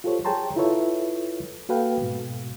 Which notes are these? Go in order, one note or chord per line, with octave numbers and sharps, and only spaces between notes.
F4 G4 A4 C5 C#5
G#4 C#5 G5 A5 A#5 C6
E4 F4 A4 B4 C#5 E5
A#3 F#4 A4 B4 F5 G5
G#2 B2